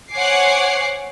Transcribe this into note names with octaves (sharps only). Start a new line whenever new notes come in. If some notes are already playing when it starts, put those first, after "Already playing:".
C5 C#5 F#5 G#5 D6 C7